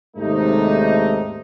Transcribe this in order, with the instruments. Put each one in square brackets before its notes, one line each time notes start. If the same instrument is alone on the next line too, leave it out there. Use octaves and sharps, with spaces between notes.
[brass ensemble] D#2 G#2 C3 A3 D4 D#4